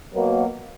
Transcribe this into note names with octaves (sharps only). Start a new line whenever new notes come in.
B2 F#3 A#3